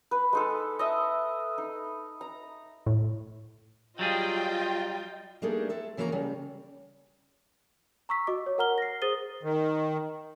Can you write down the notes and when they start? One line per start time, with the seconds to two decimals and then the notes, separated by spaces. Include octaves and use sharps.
0.11 B4
0.33 G#3 D#4 A4
0.79 D#5 E5 A5
1.58 D#4
2.21 A#5
2.86 A2
3.99 F#3 G3 F4 G#4 D#5 G5
5.42 G3 A3 A#3 D4 D#4 G#4
5.69 C4 A4 E5
5.97 C#3 E3 A#3 F#4 F#5 A#5
6.12 C#3 G3
8.09 A#5 C#6 E6 B6
8.27 F#4 D#5 D6
8.46 C#5
8.58 A#4 F#5 A#5 F6 G7
8.78 A#6 C7
9.02 G#4 C5 D#6 A6 D#7 G7
9.43 D#3